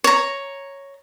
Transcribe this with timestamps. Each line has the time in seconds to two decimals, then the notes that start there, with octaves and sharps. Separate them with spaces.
0.04 C#5 A#5